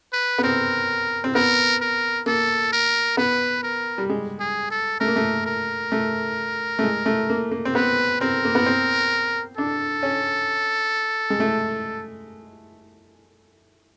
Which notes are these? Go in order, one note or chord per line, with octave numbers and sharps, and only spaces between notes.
B4
B3
C4 A#4
C4
B3 A#4
A#4
A#3 A4
A#4
B3 B4
A#4
G3
G#3
G#4
A4
A3 A#4
A#3
A3
A#4
A3
A3
G#3
A3
A#3
A#3
C4
B3 B4
C4 A#4
A#3
B3
C4
D4 A4
C#4
G#3
A3